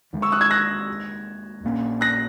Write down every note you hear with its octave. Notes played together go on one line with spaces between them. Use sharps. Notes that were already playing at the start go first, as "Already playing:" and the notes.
D#2 D#3 G#3
C#6 E6
D#6 F#6
E6 G#6
F#6 A#6
A#1 A#2 A#3 C#4
F#6 A#6